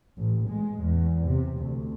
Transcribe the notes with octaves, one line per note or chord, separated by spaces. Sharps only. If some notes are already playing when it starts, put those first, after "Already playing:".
A1
G#3
E2
C3
D2